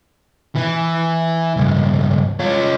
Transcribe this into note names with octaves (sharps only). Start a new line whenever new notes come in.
E3
C#2 G2
C#4 F4